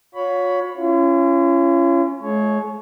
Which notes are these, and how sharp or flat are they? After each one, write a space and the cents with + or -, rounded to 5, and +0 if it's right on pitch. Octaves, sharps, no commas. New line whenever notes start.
F4 +45 C#5 +15 B5 +0
C#4 +0 F4 -45
G#3 +40 G#4 +45 C#5 +0